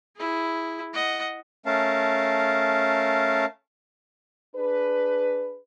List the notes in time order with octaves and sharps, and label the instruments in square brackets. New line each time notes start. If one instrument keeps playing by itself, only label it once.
[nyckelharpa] E4 G#4
D#5 F#5
[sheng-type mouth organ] A3 C#4 A#4 F5 A5
[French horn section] D4 G#4 B4